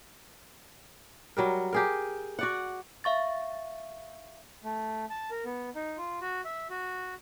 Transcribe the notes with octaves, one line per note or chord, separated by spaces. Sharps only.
F#3 G3 A#4
G4 G#4 A#4
F#4 D5 F#5
E5 F5 C#6 A6
A3
A5
A#4
B3
D#4
F4
F#4
E5
F#4